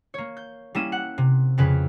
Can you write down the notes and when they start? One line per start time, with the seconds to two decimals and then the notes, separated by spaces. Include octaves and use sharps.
0.14 A#3 C#5
0.37 G6
0.75 G3 A#3 C#4 E4 D#7 E7
0.92 F#5
1.18 C3
1.58 F2 C#3 B4